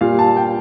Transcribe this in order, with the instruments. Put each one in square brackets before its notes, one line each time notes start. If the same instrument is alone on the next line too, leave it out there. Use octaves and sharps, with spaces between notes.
[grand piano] A#2 G3 F5
A5
G5